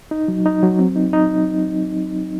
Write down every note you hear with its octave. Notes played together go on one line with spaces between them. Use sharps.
D#4
F#3
D#4
F#3
C4
D#4
D#4